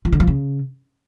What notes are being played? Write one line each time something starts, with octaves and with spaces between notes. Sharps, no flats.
F3
D3
F3
C#3